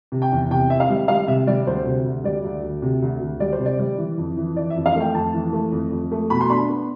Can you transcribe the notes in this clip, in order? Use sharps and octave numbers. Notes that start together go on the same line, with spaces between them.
C3
G5
E2
C3 G5
C4 E5
F5
G3
G3 F5
C3 E5
G3 D5
D2 C5
C3
D2
G3 D5
D2
D2
C3
D2
D2
G3 D5
C5
C3
D5
G3
E3
F2
E3
E3 D5
E5
F2
F5
A3 G5
F2 A5
E3
A3
F2
F2
A3
B2 B5
C6
D4 B5
B3